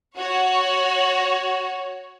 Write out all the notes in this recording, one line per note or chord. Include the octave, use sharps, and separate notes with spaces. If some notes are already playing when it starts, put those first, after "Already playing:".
F#4 C#5